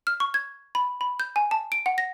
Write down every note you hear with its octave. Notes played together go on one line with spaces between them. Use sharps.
F6
C#6
G#6
B5
B5
G6
G#5
A5
D7
F#5
A#6